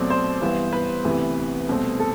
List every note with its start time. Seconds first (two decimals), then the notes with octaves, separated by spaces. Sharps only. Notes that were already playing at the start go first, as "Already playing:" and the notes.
Already playing: B2 F#3 A3 C4 D5
0.10 C5
0.41 G2 E3 B3
0.73 B4
1.05 D2 C3 E3 B3
1.68 C2 B2 A3 C4
2.00 A4